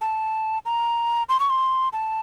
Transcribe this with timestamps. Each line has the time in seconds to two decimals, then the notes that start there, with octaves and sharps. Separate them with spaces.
0.01 A5
0.66 A#5
1.29 C6
1.40 C#6
1.50 C6
1.93 A5